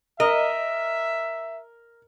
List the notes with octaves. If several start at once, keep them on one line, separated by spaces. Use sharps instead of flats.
A#4 D#5 E5